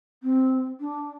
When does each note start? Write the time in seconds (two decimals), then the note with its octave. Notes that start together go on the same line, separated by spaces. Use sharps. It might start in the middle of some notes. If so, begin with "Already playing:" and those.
0.23 C4
0.80 D4